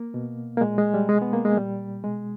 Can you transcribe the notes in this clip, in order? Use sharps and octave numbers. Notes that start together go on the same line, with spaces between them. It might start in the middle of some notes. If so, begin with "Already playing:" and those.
Already playing: A#3
B2
A#3
A#2 G#3
G#3
G3
B2 G#3
B3
A#3
G#3
A#2 G3
B2 G#3